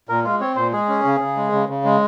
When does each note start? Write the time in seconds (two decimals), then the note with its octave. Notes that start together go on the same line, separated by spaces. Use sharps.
0.09 A#2 A#4
0.24 G#3 F4
0.40 C4 C#5
0.56 A#2 C5
0.72 G#3 G#4
0.89 C#4
1.04 C#3
1.20 C#3
1.37 G#3
1.52 C#3
1.69 C#3
1.84 G#3